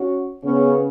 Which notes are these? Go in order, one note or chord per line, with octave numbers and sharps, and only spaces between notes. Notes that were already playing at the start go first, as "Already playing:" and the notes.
Already playing: C#4 F#4
C#3 B3 C#4